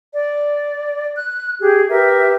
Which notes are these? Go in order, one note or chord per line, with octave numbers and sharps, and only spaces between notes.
D5
F#6
G4 G#4
G4 A#4 B4 E5